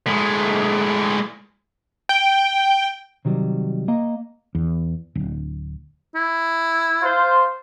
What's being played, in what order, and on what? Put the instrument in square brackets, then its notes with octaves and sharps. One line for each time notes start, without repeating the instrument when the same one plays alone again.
[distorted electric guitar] A2 G#3
[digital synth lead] G5
[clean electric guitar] C3 D#3 F#3 G3
A#3 D#5 A#5
[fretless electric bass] E2
D1
[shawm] E4
[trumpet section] F4 C5